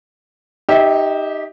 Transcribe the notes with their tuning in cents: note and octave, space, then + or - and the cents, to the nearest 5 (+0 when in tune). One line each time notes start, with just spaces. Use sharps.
D#4 +0 G4 +0 E5 -30